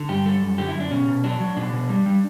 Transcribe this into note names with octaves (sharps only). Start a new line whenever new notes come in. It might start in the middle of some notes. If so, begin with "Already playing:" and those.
Already playing: D3
G2 G4
G3 A4
F#2
D3 G4
E4
F#2
D4
B2 C#4
B2
F#3 D4
F#3
B2 D4
B2
G3
G3